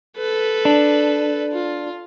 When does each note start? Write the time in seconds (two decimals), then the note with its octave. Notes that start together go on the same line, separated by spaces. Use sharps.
0.17 A4 B4
0.65 D4
1.53 F4